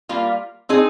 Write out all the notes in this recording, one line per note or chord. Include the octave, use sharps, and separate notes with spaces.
G3 A#3 F4
C4 D#4 G#4